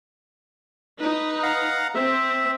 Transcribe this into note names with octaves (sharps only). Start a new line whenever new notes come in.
D#4 B4
F5 F#5 A#5
C4 E5